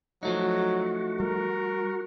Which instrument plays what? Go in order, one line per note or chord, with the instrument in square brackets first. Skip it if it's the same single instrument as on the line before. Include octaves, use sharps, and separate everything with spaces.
[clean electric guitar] F3 A3 D#4 [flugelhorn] F#3 [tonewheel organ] F#4
[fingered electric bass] G3 [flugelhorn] A#4